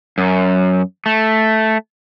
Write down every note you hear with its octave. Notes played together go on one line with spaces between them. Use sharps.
F#2
A3